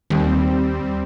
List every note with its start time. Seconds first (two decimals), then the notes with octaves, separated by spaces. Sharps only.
0.10 D#2 G3 C4